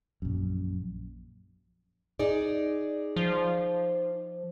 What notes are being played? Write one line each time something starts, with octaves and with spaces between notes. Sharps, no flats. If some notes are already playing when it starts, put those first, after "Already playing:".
A#1 F#2
D#4 G#4 D5
F3